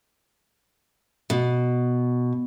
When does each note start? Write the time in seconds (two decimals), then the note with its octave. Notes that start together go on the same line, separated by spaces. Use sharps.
1.30 B2